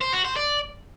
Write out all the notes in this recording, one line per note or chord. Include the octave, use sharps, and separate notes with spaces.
C5
F#4
C5
D5